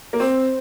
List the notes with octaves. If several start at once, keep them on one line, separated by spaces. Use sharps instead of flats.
A#3
C4 C5